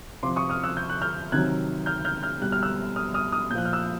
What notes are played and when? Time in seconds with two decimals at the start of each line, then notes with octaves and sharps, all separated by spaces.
0.23 C3 F3 C6 D6
0.36 C#6 D#6
0.49 D#6 F6
0.64 E6 F#6
0.77 G6
0.89 F#6
1.02 F6 G6
1.32 C3 D#3 F#3 F#6 G#6
1.86 F6 G6
2.05 F6 G6
2.23 F6 G6
2.41 B2 G3 F#6
2.52 F6
2.63 E6 F#6
2.96 D#6 F6
3.14 D#6 F6
3.32 D#6 F6
3.50 A#2 G6
3.55 F3 F#6
3.65 F6
3.73 E6 F#6